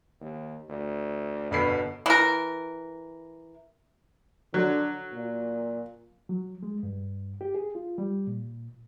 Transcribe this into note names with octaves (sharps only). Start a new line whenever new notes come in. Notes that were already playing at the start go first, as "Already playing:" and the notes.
D#2
D2
G1 B2 B5 C7
E3 A#4
D3 F#3
A#2
F#3
G#3
G2
G4
G#4
F4
G3
A#2